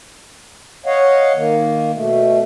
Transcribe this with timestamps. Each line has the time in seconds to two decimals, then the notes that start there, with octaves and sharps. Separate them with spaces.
0.86 C#5 D#5 F5 F#5
1.35 D#3 A#3
1.94 B2 A3